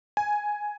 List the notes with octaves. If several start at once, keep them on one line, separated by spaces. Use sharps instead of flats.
G#5